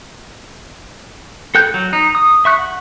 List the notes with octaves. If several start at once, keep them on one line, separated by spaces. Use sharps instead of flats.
A4 G5 F#6 G6
F#3
D#4
D#6
E5 C#6 F#6
F#5